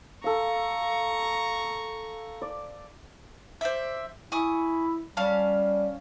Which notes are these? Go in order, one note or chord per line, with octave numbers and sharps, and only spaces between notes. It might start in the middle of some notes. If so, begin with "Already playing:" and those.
A4 F5 A#5 C#6
D5
C5 D5 E5
E4 G#5 C#6 D#6
G3 C#4 F5 A5